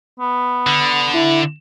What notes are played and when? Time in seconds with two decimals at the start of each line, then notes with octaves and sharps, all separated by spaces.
0.20 B3
0.67 D3
1.14 E4